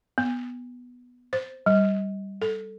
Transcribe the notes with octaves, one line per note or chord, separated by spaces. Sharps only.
B3
C5
G3
A4